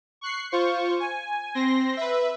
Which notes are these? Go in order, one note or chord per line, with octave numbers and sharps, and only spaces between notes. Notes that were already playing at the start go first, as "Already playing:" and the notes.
C#6 F#6 C7
F4 C5 C#6
G#5
C4 C6 A#6
B4 E5